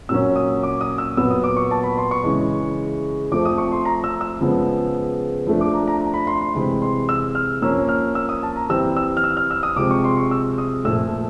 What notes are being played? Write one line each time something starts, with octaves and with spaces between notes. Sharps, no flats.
A#2 F#3 A#3 C#4 E6
D#6
D6
D#6
E6
A#2 F#3 B3 E6
D#6
D6
C#6
A5
B5
C6
C#6
C#3 E3 G#3
F3 A3 C4 D6
D#6
C#6
C6
A#5
E6
E6
C#3 F3 G#3 B3
F3 A3 D4
D6
A#5
A#5
A#5
B5
C6
C6
C3 E3 G#3 C4 B5
C6
E6
F6
F3 A#3 C#4 E6
F6
E6
D#6
A5
A#5
E3 G3 C4 E6
E6
F6
E6
F6
E6
D#6
C3 F3 G#3 C4 D6
C#6
C6
C#6
E6
D#6
A#2 F3 A3 E6